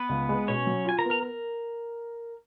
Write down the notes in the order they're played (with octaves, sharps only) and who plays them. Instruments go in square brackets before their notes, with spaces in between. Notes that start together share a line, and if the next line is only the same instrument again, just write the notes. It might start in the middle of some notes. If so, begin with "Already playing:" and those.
Already playing: [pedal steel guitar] B3 B4
[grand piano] C#2
G#3
[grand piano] B2 [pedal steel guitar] C#4 C#5
[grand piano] F#3
[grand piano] F4 [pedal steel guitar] G#5
[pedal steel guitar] A#4 A#5
[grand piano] B3
[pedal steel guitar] A#4 A#5
A#4